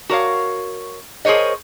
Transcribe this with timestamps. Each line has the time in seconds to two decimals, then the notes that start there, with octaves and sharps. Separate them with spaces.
0.09 F#4 A#4 C#5 F5
1.25 G#4 A#4 C5 C#5 D#5